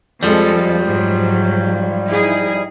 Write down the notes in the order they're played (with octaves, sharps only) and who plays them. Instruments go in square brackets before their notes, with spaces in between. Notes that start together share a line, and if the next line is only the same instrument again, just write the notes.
[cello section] F2 G#3 A4 [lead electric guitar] F3 G3
[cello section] G#2 F#3
D#4 E4 G#4